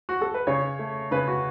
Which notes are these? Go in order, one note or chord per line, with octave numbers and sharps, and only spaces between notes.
F#4
A4
B4
C#3 C#5
A3
C#3 B4
F#4